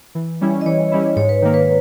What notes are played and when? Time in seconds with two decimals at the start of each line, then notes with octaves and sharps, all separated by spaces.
0.15 E3
0.41 G3 C#4 E4
0.61 D#5
0.66 E3 C#5
0.92 G3 C#4 E4
1.16 G#2 C#5
1.29 B4
1.42 D#3 A#3
1.54 B4